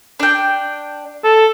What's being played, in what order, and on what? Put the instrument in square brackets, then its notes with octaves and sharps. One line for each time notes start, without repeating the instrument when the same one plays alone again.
[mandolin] D4 G5
[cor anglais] A4